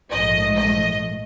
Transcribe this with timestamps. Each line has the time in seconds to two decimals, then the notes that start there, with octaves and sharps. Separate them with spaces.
0.11 A#1 G#2 F3 A3 D#5
0.57 D#5